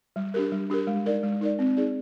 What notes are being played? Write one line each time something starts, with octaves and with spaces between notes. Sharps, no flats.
G3
D4 G4 A#4
G3
D4 G4 A#4
G#3
D#4 A#4 D5
G#3
D#4 A#4 D5
C4
D#4 G#4 D5